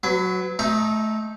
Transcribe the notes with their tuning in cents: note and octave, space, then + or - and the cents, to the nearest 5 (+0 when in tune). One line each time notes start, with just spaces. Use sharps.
F#3 +0 B4 +30
A3 -20 D#4 +10 A#5 +0